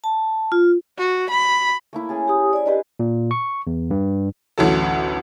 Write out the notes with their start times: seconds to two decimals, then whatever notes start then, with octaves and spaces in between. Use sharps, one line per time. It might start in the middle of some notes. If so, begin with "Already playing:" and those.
0.04 A5
0.52 F4
0.98 F#4
1.30 B5
1.93 A3 A#3 E4
2.09 C#4 G#4 A5
2.28 G4 D#6
2.53 D5 G#5
2.66 D4 G4 B4 D#5 C6
3.00 A#2
3.31 C#6
3.67 E2
3.91 G2
4.58 A1 D2 E3 F#3 A4